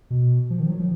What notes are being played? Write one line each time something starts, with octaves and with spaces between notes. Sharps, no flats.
B2
F3
D#3
F#3
F3